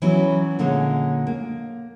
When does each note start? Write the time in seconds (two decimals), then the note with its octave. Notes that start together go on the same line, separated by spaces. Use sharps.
0.02 E3 F#3 B3 C#4 E4
0.59 A#2 D3 G#3 A#3 C#4
1.27 A#3